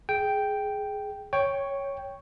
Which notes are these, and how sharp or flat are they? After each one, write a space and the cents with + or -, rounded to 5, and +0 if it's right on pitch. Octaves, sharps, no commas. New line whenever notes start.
G#4 +10 G5 +0
C#5 +0 G5 +5 C#6 +0